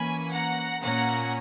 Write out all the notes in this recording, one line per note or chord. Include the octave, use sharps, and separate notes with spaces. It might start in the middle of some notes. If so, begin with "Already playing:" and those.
Already playing: E3 A#3 C#4 G#5 B5
F#5 A#5
A#2 A#3 C#4 F#5 A#5